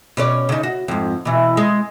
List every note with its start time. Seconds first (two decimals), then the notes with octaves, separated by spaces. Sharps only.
0.17 B2 C#4 D5
0.49 C#3 D#4
0.63 F#4
0.88 F2 G#2
1.25 B2 E3
1.57 G#3